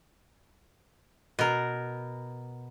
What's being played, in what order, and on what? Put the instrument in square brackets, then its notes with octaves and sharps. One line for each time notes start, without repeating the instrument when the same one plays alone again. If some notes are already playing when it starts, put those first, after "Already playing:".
[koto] B2 A#4